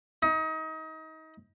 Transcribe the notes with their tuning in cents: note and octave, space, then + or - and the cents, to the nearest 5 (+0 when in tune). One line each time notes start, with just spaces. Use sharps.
D#4 +30